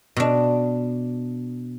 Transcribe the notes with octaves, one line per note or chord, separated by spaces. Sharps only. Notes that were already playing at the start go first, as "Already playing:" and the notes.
B2 D4